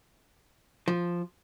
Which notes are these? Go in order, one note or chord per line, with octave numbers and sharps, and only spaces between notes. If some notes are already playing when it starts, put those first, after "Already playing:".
F3